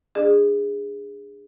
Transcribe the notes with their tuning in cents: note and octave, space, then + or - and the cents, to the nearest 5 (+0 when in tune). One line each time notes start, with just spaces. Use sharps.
D4 +0 G#4 -20 D5 +45